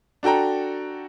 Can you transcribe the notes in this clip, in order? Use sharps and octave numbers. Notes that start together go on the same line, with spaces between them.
D4 F#4 A4 G5 A#5